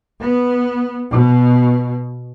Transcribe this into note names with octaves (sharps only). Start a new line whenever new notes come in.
B3
B2